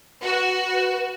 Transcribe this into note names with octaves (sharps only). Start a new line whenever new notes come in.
F#4 B4